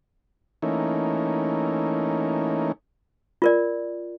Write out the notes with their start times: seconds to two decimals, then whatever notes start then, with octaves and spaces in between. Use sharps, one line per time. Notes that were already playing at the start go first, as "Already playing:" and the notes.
0.62 E3 A3 A#3 C#4 D#4
3.42 F4 A#4 D5